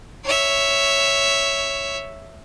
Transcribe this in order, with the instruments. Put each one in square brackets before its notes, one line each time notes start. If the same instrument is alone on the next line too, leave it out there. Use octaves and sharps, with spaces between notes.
[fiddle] C#5 E5